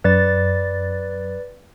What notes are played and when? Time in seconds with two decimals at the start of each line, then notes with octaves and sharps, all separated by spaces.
0.04 F#2 B4 D5 A6